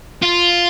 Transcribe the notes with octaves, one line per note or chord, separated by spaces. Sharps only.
F4